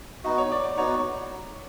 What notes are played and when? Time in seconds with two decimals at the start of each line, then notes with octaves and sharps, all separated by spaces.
0.24 B3 D#4 F#4 D#5
0.38 C#5
0.51 D5
0.63 D5
0.77 B3 D#4 F#4 C#5